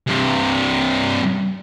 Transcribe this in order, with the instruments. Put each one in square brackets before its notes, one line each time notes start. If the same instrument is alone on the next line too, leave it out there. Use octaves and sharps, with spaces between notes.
[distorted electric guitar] G2 C3